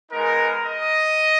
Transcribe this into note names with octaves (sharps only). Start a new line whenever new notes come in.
G#3 B3 D#4 A#4
D#5